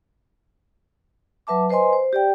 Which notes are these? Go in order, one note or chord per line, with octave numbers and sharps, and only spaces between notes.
F#3 B4 E5 A5 D6
B4 C5 D#5 G#5 C6
C5
G4 D5 G5